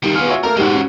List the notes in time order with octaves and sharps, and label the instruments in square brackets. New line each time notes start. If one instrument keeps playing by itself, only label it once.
[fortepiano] D#3 [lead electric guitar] G3 A#3
[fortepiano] B3 F6 [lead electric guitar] F4 G#4
[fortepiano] F#4 C#5 E5
[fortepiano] A3 A#3 [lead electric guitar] A#4
[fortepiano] G#2 G4 [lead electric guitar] G#3 F#4
[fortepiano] C#4